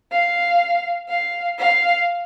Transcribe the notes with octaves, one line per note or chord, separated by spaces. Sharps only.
F5
F5
F5